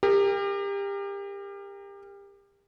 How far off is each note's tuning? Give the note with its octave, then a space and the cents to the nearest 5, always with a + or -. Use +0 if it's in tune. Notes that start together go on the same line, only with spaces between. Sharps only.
G4 +30 A#4 -15